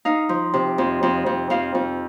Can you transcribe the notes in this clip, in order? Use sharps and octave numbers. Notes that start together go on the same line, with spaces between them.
D#4 F5
F3
C3
F2
F2
F2
F2 F5
F2